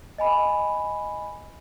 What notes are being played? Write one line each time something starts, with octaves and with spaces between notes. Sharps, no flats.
D#5 G#5 B5